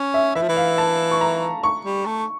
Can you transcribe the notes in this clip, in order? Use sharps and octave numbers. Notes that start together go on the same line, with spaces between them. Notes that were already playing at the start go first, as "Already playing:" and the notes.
Already playing: C#4
E5
E3 E5
F3
E3
F5
A5
C#6
A#5
C#6
G3
A3